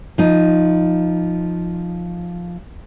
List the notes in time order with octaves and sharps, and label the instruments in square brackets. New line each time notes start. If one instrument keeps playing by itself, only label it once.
[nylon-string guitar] F3 D#4